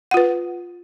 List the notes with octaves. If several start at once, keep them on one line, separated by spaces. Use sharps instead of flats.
F4 B4 F#5